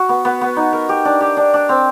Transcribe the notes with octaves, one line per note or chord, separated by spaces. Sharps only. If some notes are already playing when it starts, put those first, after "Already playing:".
Already playing: F#4
B3
B3
B3
D#4
A#4
G4
D4
G4
D4
D4
C4